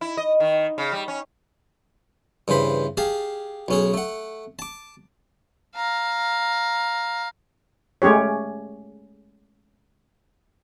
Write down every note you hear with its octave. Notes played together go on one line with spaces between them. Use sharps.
E4
D#5
D#3
C#3
G3
C#4
G2 C#3 E3 C5 B5
G4 G#4 F5 A5
B1 C#4 G#4
A3 F#5
A5 D6
F5 A#5
G#3 A3 C#4 G4 C#5